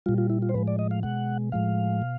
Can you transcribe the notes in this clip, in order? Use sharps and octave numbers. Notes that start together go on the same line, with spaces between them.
A#2 G3 F4
F4
E4
F4
C5
A2 F3 G#3 B4
D5
D#5
F5
B2 G#3 F#5
A2 F3 G#3 F5
B2